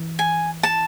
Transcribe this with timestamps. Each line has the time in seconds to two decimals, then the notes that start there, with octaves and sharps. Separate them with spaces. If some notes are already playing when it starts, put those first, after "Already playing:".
Already playing: E3
0.19 G#5
0.63 A5